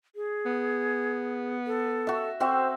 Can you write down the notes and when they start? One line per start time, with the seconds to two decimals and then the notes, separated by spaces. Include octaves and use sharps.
0.16 G#4
0.45 B3
1.67 A4
2.07 F#4 E5
2.40 C4 F#4 C5 E5